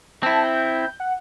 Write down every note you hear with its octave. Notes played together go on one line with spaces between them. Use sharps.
C4 E4 A5
G6
F#5